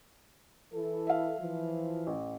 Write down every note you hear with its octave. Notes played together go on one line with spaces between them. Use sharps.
E3 E4 A4
E5 F5
E3 F3
A1